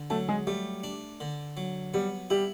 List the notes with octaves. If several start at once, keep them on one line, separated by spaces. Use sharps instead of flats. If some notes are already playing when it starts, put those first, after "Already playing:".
Already playing: D3
F#3 A3 A4
G#3 G#4
G3 A3 G4
D4
D3
F#3
G3 B3 G4
G3 E4 G4